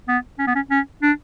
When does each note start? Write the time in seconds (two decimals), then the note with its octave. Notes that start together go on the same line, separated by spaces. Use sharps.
0.08 B3
0.39 C#4
0.47 B3
0.55 C#4
0.70 C#4
1.02 D4